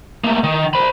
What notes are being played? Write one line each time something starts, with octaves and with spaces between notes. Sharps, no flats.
A3 A#3
D#3
C5 B5